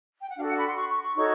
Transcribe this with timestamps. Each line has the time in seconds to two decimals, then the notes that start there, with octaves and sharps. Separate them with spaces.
0.21 G5
0.29 F#5
0.37 D4 F#4 A4 F5
0.47 F#5
0.57 B5
0.67 C6
0.75 C#6
0.90 C#6
1.03 C#6
1.16 D#4 F#4 A4 C#5 C#6